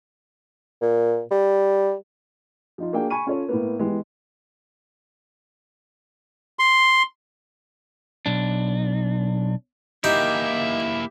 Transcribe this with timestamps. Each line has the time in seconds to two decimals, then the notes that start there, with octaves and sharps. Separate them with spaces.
0.82 A#2
1.31 G3
2.78 F3 D#4 F4
2.93 A#3 D4 F#4 G#4 F5 G5
3.10 G#5 B5 C#6 D#7
3.27 C#4 F4 A4 C#5
3.49 A2 A#3 B3
3.79 E3 G#3 B3 G4
6.59 C6
8.26 B1 D4
10.04 E3 A#3 D#4 E4 G4 E5